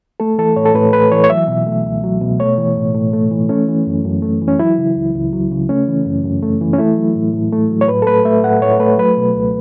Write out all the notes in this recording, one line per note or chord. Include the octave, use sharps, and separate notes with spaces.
A3 A4
E3 A4
A2 C#5
A4
A2 B4
A3 B4
E3 C#5
C#5
F#3 E5
B2
A3
C#2
F#3
B2
A3 C#5
E3
A2
A2
A3
E3
A3 C#4
E3
F#2
F#2
A3
E3
C#4
F#3 E4
C#3
C#2
C#2
F#3
C#3
A3 C#4
E3
F#2
F#2
A3
E3
C#4
A3 E4
F#3
A2
A2
A3
F#3
C#5
A2 B4
A4
A3 B4
A3 E5
A2 F#5
A2 C#5
A3 B4
F#3 B4
B2
C#2